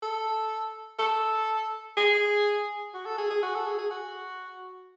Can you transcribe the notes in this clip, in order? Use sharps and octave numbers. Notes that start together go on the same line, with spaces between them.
A4
A4
G#4
F#4
A4
G#4
G#4
F#4
A4
G#4
G#4
F#4